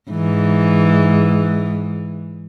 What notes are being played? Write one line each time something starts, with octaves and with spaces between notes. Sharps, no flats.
G#2 E3